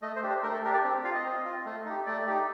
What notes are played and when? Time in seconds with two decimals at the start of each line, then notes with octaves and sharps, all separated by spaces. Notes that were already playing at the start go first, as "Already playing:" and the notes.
0.02 A3 D#5
0.16 C5
0.23 D4 G4
0.29 C5
0.43 A3 A#4
0.53 A4
0.64 D4 G4 A#4
0.74 D5
0.84 C4
1.04 F4 F5
1.15 D#5
1.25 C4
1.45 F4
1.66 A3
1.86 D#4 G4
2.06 A3 D5
2.27 D#4 G4